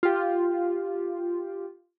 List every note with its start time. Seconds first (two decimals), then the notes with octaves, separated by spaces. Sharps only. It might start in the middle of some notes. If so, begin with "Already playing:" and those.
0.03 F4 G4